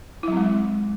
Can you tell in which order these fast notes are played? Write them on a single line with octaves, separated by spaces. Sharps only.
E4 F#3 C4 G#3